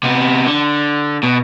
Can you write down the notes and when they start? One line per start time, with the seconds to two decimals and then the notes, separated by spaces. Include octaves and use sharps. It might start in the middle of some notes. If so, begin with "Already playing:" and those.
0.03 C3 B3
0.47 D3
1.23 B2